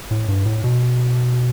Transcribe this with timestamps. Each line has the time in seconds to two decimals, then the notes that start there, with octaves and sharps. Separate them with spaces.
0.11 A2
0.28 G2
0.46 A2
0.64 B2